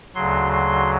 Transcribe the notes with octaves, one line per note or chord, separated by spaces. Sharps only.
D2 C#3 F#3 C6
C6